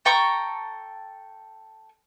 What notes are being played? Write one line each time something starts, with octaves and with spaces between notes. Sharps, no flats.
A4 G5 A#5 C#6